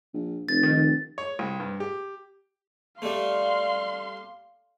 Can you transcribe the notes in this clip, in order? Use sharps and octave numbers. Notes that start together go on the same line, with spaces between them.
A#1
F1 A6
D#3
C#5
C2
G2
G4
G3 A3 F5 C6